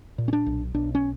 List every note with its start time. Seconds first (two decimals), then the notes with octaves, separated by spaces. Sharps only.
0.18 A#2
0.28 C#4
0.33 D4
0.46 B1
0.74 B1 D4
0.95 C#4